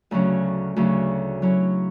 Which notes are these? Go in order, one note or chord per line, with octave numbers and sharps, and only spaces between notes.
D2 C#3 F#3 C#4
D2 C#3 F#3 C#4
F#3 C#4 E4